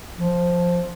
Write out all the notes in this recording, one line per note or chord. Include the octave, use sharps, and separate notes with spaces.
F3